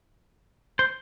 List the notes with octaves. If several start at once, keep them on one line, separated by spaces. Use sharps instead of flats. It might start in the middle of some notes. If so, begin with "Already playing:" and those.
C5